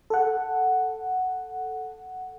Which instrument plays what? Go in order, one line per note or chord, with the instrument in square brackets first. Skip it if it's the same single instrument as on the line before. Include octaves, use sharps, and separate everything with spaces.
[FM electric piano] A4 F#5